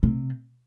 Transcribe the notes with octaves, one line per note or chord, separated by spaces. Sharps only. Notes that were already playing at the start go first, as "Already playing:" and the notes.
C3